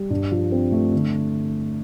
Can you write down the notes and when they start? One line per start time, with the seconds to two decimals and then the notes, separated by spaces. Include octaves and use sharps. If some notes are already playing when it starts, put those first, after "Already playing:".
Already playing: G3
0.10 G2
0.32 F3
0.52 C4
0.72 A3
0.94 D3